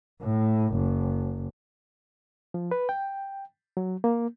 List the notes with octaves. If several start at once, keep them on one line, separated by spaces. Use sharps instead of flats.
A2
F#1
F3
B4
G5
F#3
A#3